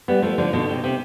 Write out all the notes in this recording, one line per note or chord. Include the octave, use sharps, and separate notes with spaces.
G3 B3
F3 A3
D3 F3
B2 D3
C3
C3